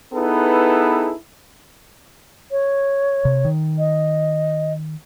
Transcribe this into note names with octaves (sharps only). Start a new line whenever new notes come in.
B3 D#4 E4 G#4 A4 B4
C#5
C3
D#3
D#5